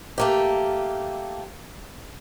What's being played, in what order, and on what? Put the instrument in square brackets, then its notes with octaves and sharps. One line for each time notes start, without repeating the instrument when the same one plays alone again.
[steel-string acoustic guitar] A3 A#3 G4